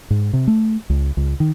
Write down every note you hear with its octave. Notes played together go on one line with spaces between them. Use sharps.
G#2
C3
A3
C#2
C#2
D#3